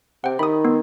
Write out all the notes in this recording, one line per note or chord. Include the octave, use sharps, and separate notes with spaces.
C3 F#5 G5
D#3 B5 D#6
B3